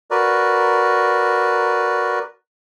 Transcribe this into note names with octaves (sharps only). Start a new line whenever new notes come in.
F#4 A#4 B4 D5